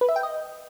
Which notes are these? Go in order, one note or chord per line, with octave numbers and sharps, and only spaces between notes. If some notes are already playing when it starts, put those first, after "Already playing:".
B4
E5
G5
D#5